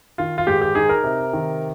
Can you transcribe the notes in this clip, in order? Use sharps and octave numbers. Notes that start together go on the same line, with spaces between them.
D#3 F4
F4
G#2 G4
G4
D#4 G#4
A#4
C3
D#3